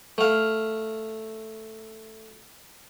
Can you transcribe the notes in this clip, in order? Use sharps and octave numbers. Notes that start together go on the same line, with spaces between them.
A3 F5